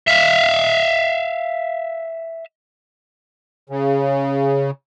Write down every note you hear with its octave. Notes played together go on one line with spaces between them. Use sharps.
E5 F5
C#3